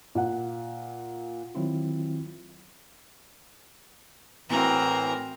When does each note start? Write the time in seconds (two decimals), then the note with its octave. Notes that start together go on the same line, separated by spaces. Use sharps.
0.15 A#2 F#5
1.55 D#3 F#3 C4 E4 F4
4.50 A2 E3 C4 F#4 A#4 A#5